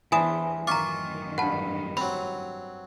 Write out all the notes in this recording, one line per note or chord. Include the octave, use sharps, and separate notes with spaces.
E2 E3 D4 C5 G#5 D#6 E7
F#2 A2 D#3 F4 A#5 C#6 D6
G2 B4 F#5 A5
F#3 C4 B5